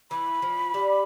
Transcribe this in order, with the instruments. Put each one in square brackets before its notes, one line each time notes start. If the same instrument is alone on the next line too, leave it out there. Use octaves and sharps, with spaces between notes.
[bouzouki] E3 [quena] B5
[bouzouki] F3
G3